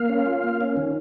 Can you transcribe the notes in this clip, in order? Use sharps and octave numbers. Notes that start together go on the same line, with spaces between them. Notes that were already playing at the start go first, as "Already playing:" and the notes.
Already playing: A#3 F5
C#4
F4
A#3
C#4
D#3